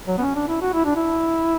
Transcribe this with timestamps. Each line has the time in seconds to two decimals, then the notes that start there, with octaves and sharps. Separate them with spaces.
0.08 F#3
0.18 B3
0.21 C#4
0.35 D4
0.48 E4
0.62 F#4
0.73 E4
0.85 D4
0.96 E4